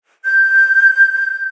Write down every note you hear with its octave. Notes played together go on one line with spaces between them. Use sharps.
G6